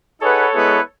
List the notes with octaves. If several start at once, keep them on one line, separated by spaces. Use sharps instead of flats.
D#4 G#4 A4 B4 C#5 F#5
G#3 B3 E4 G#4 B4